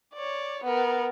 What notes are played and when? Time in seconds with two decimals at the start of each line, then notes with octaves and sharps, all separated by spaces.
0.14 C#5 D5
0.64 B3 A#4